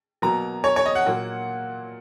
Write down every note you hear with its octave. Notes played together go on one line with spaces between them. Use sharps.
B2 F#3 A#3 A#5
C#5
C#5
D#5
F#5
A#2 F#3 A#3